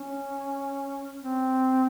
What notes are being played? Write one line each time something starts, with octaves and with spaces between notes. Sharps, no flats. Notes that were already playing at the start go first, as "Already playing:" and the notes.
Already playing: C#4
C4